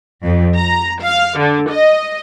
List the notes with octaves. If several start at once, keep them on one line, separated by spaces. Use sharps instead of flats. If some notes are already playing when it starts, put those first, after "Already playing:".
F2
A#5
F5
D3
D#5